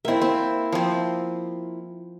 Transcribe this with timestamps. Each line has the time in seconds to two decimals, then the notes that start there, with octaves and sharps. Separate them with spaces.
0.05 A#3 C4 E4 E5
0.22 C4
0.72 F3 C4